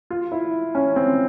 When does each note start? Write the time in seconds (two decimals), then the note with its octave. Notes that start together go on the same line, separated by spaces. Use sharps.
0.10 F4
0.32 E4
0.75 C#4
0.96 C4